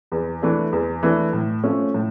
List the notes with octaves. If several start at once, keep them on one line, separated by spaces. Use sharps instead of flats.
E2
E3 A3 D4
E2
E3 A3 D4
A2
F3 A3 C#4
A2